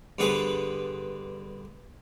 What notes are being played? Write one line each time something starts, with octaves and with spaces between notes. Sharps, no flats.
G2 D3 B3 G#4 B4 C5